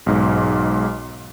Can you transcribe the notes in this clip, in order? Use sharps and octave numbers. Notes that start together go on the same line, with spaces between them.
B1 G#2